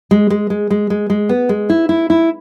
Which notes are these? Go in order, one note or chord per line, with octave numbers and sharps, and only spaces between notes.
G#3
G#3
G#3
G#3
G#3
G#3
B3
G#3
E4
E4
E4